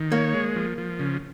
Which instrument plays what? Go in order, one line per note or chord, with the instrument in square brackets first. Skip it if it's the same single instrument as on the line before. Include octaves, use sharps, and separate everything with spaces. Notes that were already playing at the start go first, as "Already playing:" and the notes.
Already playing: [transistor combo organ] D#3
[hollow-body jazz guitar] A#3 [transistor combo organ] C#5
[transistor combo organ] G#3
F3
F3
C#3